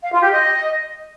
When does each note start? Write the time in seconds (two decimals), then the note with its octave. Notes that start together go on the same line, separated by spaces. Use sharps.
0.03 F5
0.12 F4
0.21 G4
0.31 D#5